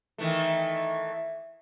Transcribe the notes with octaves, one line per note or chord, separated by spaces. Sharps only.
D#3 E3 A3